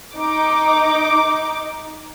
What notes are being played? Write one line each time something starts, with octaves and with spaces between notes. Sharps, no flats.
D#4 D6